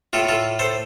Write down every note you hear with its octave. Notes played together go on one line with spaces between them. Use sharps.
A2 F4 A4
F4 A4
A4 C5